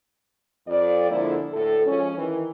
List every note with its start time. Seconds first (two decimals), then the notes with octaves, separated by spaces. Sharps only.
0.68 F2 D5
1.10 D3 F3 G#3 A#3 E4
1.52 D2 A2 A4
1.86 F3 G#3 C#4
2.17 D#3 E3